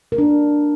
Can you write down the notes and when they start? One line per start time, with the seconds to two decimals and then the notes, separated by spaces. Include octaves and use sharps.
0.12 A#4
0.18 D4